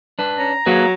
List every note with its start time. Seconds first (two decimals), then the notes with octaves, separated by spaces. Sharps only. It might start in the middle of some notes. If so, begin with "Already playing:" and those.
0.19 D4 B4
0.38 C#4 A#5
0.66 F#3 A#3 G#4 B4